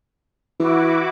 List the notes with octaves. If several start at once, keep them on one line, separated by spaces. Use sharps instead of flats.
E3 E4 F#4 D6